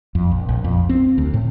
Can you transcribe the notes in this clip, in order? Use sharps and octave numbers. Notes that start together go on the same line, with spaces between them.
F2
A#1
A#1
F2
C4
D2
A2